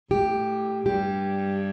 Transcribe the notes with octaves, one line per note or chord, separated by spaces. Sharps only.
A2 G4
G2 G4